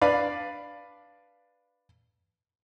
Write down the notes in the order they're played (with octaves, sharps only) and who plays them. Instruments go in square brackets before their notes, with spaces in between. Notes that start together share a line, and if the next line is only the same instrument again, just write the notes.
[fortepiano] D4 B4 D5 F5